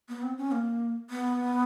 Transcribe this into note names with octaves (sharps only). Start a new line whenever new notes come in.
B3
C4
C#4
A#3
B3